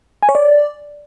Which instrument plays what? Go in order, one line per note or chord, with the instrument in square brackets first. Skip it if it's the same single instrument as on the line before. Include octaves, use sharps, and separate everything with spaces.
[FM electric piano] G#5
C#5
D5